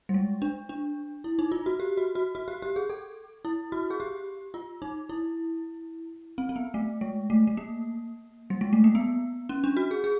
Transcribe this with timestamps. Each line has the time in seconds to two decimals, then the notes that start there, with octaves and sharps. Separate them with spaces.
0.09 G3
0.14 G#3
0.42 D4
0.69 D4
1.24 E4
1.39 D#4
1.52 F4
1.66 F#4
1.80 G4
1.97 F#4
2.15 F#4
2.35 F#4
2.48 G4
2.62 G4
2.76 G#4
2.90 A4
3.45 E4
3.72 F#4
3.90 G#4
4.00 G4
4.54 F4
4.82 D#4
5.09 E4
6.38 C4
6.49 C4
6.56 B3
6.74 A3
7.01 G#3
7.30 A3
7.47 A3
7.57 A#3
8.50 G3
8.61 G#3
8.73 A3
8.84 A#3
8.95 B3
9.49 C#4
9.64 D4
9.77 F#4
9.91 G#4
10.04 G#4